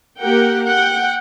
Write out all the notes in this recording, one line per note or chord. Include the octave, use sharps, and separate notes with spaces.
A#3 G4 A#4 F#5 G5
F#5 G5